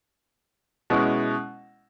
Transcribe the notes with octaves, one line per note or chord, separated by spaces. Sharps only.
B2 G#3 C#4 E4